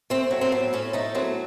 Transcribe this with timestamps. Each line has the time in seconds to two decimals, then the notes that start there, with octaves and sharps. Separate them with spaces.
0.10 A3 C4
0.31 F#3
0.41 C4
0.52 A2
0.73 A2 C#4
0.93 A3 D#4
1.15 F#3 C4